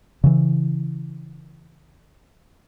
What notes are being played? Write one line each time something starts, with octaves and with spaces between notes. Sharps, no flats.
C#3 E3